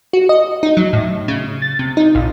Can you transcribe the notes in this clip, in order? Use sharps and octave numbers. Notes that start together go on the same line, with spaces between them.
F#4
D#5
D#4
F#3
A2
C#3
A6
C3
D#4
A#1